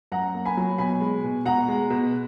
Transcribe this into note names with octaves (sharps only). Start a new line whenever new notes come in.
F#2 F#5 A#5
A#3
G#5 B5
F#3
B2 G#5 B5
G#3
B2
B2 F#5 A#5
G#3
B2